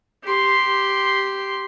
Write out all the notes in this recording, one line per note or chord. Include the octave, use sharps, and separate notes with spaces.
G4 C6